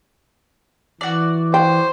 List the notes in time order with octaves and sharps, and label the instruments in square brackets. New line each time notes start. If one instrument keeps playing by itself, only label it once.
[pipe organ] E3 [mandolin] F#4 D5
[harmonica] C5 [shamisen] G5